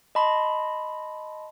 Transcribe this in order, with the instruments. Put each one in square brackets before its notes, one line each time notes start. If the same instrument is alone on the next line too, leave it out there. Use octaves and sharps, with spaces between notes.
[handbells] D#5 A5 B5 C6